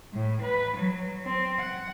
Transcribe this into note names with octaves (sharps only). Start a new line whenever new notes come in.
A2
B4
F#3
C4
F#5